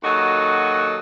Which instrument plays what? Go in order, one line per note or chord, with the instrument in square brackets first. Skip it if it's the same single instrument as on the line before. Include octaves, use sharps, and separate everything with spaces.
[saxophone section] D#2 F#3 F#4 A4 D#5